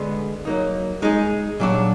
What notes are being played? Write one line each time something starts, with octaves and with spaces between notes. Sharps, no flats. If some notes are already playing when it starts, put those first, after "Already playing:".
Already playing: D3 G#3 B3
F#3 A#3 D#4
G#3 D#4 G#4
A#2 F#3 D4